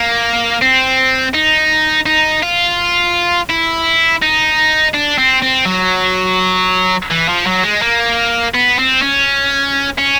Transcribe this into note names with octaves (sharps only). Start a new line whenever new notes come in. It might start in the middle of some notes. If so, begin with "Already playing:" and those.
Already playing: A#3
C4
D#4
D#4
F4
E4
D#4
D4
C4
C4
F#3
E3
F3
F#3
G#3
A#3
B3
C4
C#4
C#4